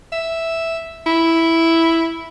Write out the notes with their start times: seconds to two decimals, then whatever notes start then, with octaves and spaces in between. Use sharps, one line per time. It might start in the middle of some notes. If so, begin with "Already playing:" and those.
0.12 E5
1.06 E4